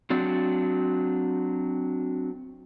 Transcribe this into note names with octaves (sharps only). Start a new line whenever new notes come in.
F#3 C4 D4 F#4